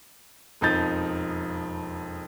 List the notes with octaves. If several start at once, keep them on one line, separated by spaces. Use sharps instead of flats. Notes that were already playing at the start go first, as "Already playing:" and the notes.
E1 F2 F3 D#4 G6 A6